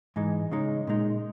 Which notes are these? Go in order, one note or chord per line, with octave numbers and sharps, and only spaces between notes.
G#2 E3 G#3 D#4
C#3 G#3 D#4
A#2 G#3 D#4